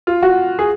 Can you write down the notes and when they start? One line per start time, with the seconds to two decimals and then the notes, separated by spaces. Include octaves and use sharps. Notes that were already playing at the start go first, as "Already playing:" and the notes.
0.07 F4
0.23 F#4
0.59 G#4